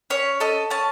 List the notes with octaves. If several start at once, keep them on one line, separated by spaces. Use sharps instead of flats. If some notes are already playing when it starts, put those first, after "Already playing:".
C#4 C#5
A4 D#5
C#4 A5